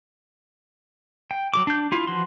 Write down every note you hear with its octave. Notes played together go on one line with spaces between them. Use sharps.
G5
F#3 G4 D6
D4 G6
E4 F4
E3 F3 F#4 C6